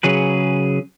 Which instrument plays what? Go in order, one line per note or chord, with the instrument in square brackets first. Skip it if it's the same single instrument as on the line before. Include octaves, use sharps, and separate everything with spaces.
[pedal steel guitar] C#3 F#3 G#4 B4